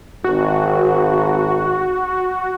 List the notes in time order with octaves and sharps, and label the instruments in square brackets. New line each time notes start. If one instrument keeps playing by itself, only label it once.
[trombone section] G#1 [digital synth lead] F#4